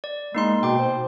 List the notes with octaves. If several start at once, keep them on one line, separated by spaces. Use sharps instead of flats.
D5
G#3 A#3 D#4 C6
B2 G5 D6
C5